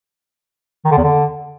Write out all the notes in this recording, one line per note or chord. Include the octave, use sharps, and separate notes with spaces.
D#3
D3
E2
D3